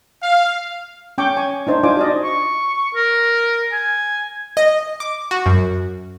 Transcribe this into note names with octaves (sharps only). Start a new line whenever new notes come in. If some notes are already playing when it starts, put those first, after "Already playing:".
F5
C#4 G5 C#6 D6
G#5 C#6
D4 D#4 C5
D4 F4 C5 G#5 D6
F#4 D5 D#5
C#6
A#4
G#5
D#5
D6
F#4
F#2